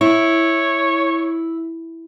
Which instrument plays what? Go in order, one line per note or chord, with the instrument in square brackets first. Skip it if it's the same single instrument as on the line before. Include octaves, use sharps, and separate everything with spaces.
[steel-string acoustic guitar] E4 [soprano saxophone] C#5